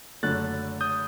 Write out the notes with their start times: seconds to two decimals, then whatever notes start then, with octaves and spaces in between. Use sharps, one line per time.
0.23 F#1 F#2 D3 A3 F#6 A6
0.81 D#6 G6